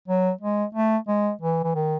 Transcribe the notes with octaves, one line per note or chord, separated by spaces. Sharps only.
F#3
G#3
A3
G#3
E3
E3
D#3